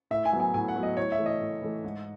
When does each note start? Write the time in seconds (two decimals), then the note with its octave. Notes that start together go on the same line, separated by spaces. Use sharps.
0.11 A2 E5
0.25 G#5
0.33 F#3 B3
0.40 G#5
0.54 A2 G#5
0.68 F#5
0.76 F#3 B3
0.83 D#5
0.97 A2 C#5
1.12 E5
1.18 E3 A3
1.26 D#5
1.41 A2
1.62 E3 A3
1.84 G#2